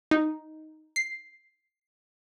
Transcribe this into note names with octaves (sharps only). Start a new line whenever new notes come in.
D#4
C7